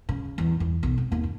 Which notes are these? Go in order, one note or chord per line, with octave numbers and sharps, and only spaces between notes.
C#3
E2
E2
B1
C4
D#2
F#2